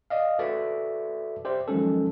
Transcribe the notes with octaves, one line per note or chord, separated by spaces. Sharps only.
D5 D#5 F5
F#4 A4 B4 D5 E5
G4 C5 D5 E5
D#3 F3 F#3 G#3 C#4 A4